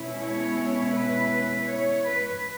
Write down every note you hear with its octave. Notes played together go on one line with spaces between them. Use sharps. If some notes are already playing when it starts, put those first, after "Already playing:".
Already playing: B2 G#3 C#4 E4
C#5
B4
C#5
B4